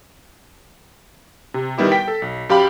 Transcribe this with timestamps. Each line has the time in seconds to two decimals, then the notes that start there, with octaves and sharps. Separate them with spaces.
1.54 C3
1.78 D#3 G3 B3 E4 G4
1.92 G5 B6
2.08 A4
2.22 B1
2.49 F#2 G4 F5 B5